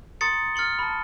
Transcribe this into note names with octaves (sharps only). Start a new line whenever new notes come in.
A#5 C6 D#6 A6 C#7
F6 A6 C#7 F#7 G7
A5 B5